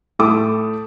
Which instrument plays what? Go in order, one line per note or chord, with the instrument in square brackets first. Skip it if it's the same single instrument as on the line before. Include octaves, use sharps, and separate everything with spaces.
[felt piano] A2 A3 A4 D6 D#6